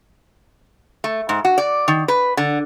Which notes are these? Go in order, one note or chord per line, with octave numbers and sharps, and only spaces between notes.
A3
G#2
F#4
D5
D#3
B4
D3